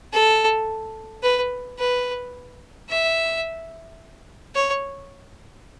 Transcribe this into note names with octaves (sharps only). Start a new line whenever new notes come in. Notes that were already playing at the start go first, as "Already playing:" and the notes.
A4
B4
B4
E5
C#5